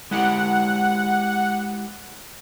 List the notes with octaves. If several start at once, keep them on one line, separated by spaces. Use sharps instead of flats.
G#3 E4 G4 F#5